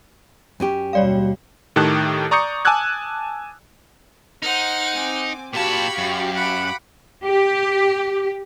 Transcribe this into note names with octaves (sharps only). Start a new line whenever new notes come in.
F#2 C#4 G4
D#2 B2 G3 C#5 D5 F5
A2 D#3 G4 A5 F#6
D5 A#5 C#6 D#6 G6 C#7
G#5 A5 D6 E6 F#6 G#6
D#4 C5 F#5 F6
C4 G#5 D6
A#2 F#4 G4 F5 A5 B5 C#6 G#6
F#2
F#5 B5 D6
G4